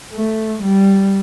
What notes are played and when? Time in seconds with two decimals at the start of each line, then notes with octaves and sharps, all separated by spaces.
0.13 A3
0.63 G3